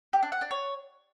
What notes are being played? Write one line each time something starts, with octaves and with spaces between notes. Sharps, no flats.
G4
D4
F#5
D4
C#5